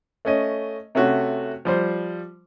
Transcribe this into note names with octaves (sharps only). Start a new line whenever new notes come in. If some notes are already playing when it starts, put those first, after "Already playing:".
A3 C#4 D#5
C3 A3 C#4 F#4
F3 G3 C5